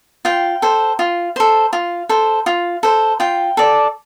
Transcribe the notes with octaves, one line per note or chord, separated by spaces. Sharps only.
F4 G5
A4 C5
F4
A4 C5
F4
A4 C5
F4
A4 C5
F4 G5
A4 D5